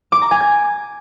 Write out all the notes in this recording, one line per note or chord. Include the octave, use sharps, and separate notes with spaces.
D6
A#5
G#5
G#6